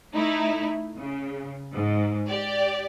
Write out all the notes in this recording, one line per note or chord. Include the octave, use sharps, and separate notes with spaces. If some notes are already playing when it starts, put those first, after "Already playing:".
A3 D#4 E4
C#3
G#2
G4 D5